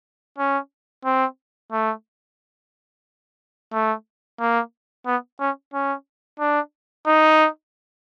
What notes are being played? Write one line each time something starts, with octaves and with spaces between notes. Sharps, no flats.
C#4
C4
A3
A3
A#3
B3
C#4
C#4
D4
D#4